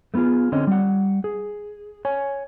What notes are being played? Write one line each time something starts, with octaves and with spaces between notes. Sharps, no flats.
A3 B3 C#4 F4 G#4
D3 C4 C#4 D#5
G3 F#5
G#4
C#5 G#5